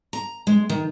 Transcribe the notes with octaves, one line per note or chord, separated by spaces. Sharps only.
A#5
G#3
D#3